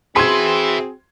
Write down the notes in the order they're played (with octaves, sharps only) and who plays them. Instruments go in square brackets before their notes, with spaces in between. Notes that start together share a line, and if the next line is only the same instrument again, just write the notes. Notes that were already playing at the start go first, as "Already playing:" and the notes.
[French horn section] C4 F#4 [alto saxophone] G#4 [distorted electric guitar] B4 E5 [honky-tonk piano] C6 G#6